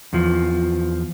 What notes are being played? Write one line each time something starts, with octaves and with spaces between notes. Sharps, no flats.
E2 F3